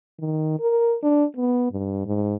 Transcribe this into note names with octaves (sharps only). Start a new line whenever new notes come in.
D#3
A#4
D4
B3
G2
G#2